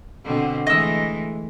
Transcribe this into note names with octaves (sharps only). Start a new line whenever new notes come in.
B2 D3 C4
E3 G#3 A3 D#5 E6